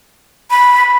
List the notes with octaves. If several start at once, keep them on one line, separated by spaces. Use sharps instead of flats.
B5